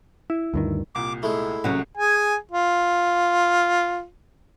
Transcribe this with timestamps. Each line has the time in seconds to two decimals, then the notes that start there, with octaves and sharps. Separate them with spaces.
0.30 E4
0.54 D2 G2 D#3
0.95 C2 A#2 D6
1.23 G#3 A3 E4
1.64 C2 F#3 C#4
1.97 G#4 G#5
2.51 F4